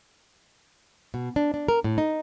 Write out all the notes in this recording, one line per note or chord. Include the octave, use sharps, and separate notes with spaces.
B2
D4
D4
A#4
A2
D#4